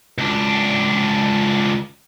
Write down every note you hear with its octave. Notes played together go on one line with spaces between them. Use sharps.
C#2 D4